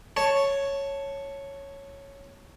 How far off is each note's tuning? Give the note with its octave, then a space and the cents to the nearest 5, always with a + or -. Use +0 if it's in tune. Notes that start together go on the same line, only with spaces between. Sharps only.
C#5 +0 A5 +0